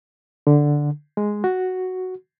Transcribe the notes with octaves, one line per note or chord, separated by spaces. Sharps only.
D3
G#3
F#4